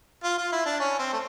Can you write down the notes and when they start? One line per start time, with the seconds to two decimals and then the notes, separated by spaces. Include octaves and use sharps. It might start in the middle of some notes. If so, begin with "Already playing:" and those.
0.24 F4
0.38 F4
0.52 E4
0.66 D4
0.80 C#4
0.99 C4
1.13 A3